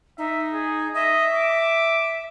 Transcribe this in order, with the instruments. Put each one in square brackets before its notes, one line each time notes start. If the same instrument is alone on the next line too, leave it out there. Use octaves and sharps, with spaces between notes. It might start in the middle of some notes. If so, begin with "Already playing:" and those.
[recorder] D#4 [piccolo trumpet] E5
[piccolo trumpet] G#4
[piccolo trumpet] D#5 [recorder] E5
[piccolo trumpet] D6